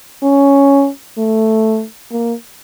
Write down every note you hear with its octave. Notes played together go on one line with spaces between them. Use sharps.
C#4
A3
A#3